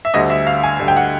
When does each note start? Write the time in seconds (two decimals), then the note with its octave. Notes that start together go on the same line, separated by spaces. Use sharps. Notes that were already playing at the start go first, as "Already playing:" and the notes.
0.05 E5
0.14 D2 D3 G3 D#5
0.30 E5
0.47 F5
0.63 G#5
0.79 D2 D3 G3
0.88 G5
0.97 F#5